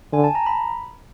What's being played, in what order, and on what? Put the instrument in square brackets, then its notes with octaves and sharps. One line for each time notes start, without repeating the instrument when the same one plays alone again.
[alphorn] D3 [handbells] G#5
[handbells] A5
A#5
B5